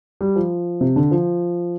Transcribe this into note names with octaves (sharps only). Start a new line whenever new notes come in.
G3
F3
C3
D3
F3